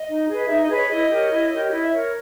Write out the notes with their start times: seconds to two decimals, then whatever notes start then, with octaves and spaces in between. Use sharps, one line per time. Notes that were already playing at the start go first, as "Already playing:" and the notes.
Already playing: D#5
0.09 D#4
0.29 G#4 B4
0.49 D#4 E5
0.63 D#5
0.69 G#4 B4
0.76 C#5
0.89 E4 D#5
1.09 G4 A#4 C#5
1.30 E4
1.49 G4 A#4 C#5
1.70 E4 D#5
1.84 E5
1.90 A#4 C#5